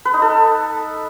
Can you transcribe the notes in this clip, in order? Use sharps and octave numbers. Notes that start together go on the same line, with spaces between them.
B4
D#4
A4